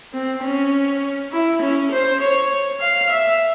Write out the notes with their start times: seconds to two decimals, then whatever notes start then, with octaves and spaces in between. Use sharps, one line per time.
0.14 C4
0.44 C#4
1.33 E4
1.62 C#4
1.92 C5
2.21 C#5
2.81 F5
3.10 E5